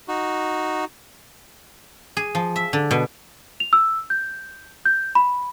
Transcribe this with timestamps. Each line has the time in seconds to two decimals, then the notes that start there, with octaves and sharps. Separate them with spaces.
0.08 D#4 F#4
2.17 G#4
2.35 F3
2.56 E5
2.73 D3
2.91 B2
3.60 F7
3.73 E6
4.10 G6
4.85 G6
5.15 B5